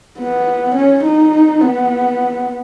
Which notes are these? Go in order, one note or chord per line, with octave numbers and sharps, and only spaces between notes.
B3
C#4
D#4
B3